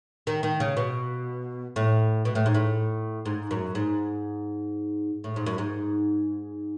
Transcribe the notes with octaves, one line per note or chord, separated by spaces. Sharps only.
D#3
D#3
C#3
B2
A2
B2
A2
G#2
A2
G#2
F#2
G#2
A2
G#2
F#2
G#2